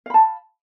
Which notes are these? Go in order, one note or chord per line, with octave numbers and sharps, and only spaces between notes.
F5 A5 B5